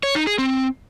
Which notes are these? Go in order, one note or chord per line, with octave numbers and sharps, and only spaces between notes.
C#5
D#4
G#4
C4